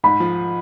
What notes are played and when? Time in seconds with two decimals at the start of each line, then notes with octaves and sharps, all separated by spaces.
0.04 G#2 B5
0.20 F3